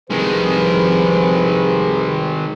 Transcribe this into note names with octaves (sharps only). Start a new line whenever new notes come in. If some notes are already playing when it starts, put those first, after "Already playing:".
C2 D#3 F3 G#3 G#4 B4